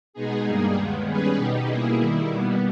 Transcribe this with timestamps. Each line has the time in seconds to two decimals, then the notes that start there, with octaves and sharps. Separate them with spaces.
0.13 B2 G#3 B3 D#4 G#4
0.44 G2 G3 A#3 D#4 G#4
0.75 D#2 D#3 G#3 B3
1.06 G3 C#4 G#4 B4
1.36 B2 G3 B3 D#4 G4
1.66 B2 A#3 E4 G#4
1.98 D#3 G3 A#3 E4
2.28 B2 G3 B3